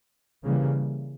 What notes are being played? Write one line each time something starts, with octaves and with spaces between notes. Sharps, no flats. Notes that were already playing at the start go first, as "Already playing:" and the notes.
C#3 E3 G3 A#3